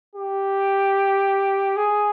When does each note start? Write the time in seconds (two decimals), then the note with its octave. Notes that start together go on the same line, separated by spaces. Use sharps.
0.16 G4
1.76 G#4